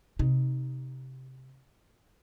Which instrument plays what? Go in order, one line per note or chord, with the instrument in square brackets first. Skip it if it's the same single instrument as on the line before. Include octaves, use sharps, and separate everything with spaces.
[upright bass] C3 D#4